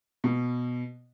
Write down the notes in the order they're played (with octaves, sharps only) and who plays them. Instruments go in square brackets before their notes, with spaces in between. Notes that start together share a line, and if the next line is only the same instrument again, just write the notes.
[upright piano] B2